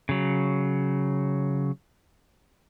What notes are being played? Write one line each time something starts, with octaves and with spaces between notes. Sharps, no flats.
C#3 F#3